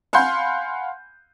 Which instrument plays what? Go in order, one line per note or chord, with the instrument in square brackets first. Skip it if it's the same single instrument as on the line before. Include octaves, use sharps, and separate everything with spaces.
[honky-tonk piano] F5 F#5 G#5 B5 C6 G6